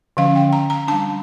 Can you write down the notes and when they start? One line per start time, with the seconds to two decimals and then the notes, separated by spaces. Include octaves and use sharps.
0.17 D3 F3 C#4 F5
0.35 G5
0.53 A#5
0.70 A#5
0.88 G3 D4 A5